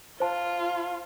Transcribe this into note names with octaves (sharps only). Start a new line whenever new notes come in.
F4 C5 A5